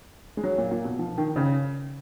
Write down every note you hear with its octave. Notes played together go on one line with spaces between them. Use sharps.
G#3
F#3
A#2
A#2
B2
F3
D#3
C#3